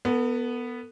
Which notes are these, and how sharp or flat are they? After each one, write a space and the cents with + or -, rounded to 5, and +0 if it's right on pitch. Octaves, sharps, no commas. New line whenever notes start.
B3 -5 A4 +40